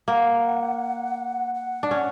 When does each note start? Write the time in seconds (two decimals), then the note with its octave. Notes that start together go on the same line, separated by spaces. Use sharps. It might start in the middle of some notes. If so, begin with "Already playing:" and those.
0.08 A#3 F#5
1.55 F#5
1.83 D4
1.91 C#4